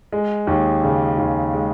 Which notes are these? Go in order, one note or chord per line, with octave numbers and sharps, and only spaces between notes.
G#3
D#2
C#3
D#2
G#3